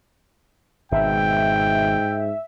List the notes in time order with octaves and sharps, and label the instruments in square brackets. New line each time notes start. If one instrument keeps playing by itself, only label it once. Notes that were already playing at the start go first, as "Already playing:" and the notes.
[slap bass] G#1 B2 [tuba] G#2 [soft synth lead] E5 [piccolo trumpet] G5